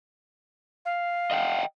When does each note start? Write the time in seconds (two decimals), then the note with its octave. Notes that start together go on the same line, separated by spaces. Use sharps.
0.85 F5
1.31 D#5 F#5 G5